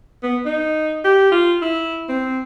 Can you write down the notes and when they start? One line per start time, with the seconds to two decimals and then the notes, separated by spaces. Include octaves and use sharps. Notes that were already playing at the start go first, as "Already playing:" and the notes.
0.23 B3
0.46 D#4
1.05 G4
1.32 F4
1.62 E4
2.09 C4